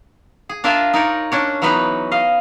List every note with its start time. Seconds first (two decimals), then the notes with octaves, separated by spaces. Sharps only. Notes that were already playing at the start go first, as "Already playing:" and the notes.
0.49 G#4
0.64 D4 F4 A#4 E5 G#5 A5
0.93 D#4 A#4 C#5 D5
1.32 C#4 D4 C#5
1.62 E3 F#3 B3 D#4 B4 A#5
2.12 D#5 F5